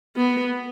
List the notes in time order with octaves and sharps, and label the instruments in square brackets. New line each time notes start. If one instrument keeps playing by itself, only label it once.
[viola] B3